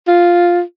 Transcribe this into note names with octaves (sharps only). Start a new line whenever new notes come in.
F4